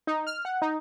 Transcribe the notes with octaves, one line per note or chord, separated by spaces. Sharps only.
D#4
F6
F#5
D#4